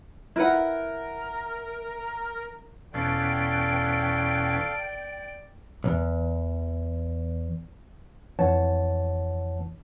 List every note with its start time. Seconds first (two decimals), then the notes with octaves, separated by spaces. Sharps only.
0.36 E4 A#4 B4 F#5
2.94 E2 B2 C#4 A4 D5 F5 G5 D7
5.84 B1 E2
8.39 F2 E3 C#5 F#5 A5